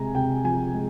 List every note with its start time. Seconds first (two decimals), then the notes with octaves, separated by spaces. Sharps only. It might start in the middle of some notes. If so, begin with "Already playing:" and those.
Already playing: C3 G#3 G#5 A#5
0.15 C3 G5
0.44 F3 G#5
0.74 G#3